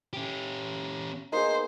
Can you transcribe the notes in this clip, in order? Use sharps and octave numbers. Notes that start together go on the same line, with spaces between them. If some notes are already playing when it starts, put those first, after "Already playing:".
C#4 G4
A#3 B3 D#4 G#4 C5